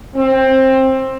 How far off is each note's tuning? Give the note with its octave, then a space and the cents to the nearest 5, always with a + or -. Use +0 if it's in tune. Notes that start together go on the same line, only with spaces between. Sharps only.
C4 +15